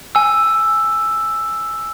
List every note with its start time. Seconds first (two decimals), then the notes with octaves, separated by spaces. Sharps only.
0.15 G#5 E6